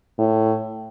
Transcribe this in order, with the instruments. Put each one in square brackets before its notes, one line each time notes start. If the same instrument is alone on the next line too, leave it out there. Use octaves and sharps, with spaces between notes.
[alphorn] A2